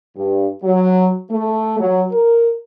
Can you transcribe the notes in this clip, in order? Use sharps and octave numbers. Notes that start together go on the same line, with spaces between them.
G2
F#3
A3
F#3
A#4